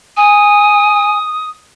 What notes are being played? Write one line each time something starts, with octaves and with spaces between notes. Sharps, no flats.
G#5 D#6